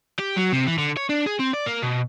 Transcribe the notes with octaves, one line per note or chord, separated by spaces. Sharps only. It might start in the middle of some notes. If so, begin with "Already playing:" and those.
G4
F#3
C3
E3
D3
C#5
D4
G#4
C4
D5
A#3
B2